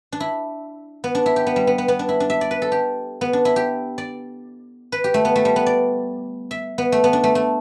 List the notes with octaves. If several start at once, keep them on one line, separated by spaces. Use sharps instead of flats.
D4
E4
B3
D4
E4
G4
B3
G3
B3
B3
B3
D4
E4
D4
E5
D5
B4
A4
G4
B3
D4
E4
G4
D5
B4
G4
A3
B3
A3
G3
B3
D5
E5
B3
A3
B3
D4
A3
A3